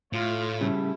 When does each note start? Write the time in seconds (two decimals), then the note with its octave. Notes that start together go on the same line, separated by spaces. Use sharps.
0.13 A2 A3 F4
0.61 C#3 G3 A3 E4